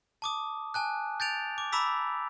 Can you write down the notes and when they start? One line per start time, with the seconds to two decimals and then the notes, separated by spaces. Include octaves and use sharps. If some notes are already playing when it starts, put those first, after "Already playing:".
0.22 A5 D6 D#6
0.74 G#5 A5 F#6
1.20 G6 A6 D7 F7
1.58 D6
1.72 A#5 B5 D6 E6 B6